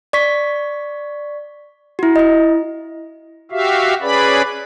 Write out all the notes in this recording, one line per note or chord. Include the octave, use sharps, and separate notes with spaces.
D5 C#6 B6
E4 F#4
E4 D#5
F#4 G4 E5 F5
C#4 G#4 B4 D5 B5